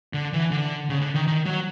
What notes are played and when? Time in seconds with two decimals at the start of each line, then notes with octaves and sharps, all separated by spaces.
0.13 D3
0.33 E3
0.51 D3
0.89 C#3
1.01 D3
1.15 D#3
1.27 D#3
1.46 F#3